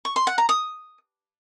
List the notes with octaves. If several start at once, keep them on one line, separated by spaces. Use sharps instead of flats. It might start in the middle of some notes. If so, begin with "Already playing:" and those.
C#6
C6
F#5
A#5
D#6